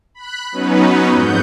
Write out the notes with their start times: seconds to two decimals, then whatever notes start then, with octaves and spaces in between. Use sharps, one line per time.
0.14 B5 F#6
0.52 F#3 B3 C#4 D#4 B4
1.10 F2 G#2 F#5 G6